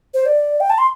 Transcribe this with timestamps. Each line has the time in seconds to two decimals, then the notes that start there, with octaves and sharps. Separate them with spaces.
0.14 C5
0.26 D5
0.60 G5
0.70 A5
0.78 C6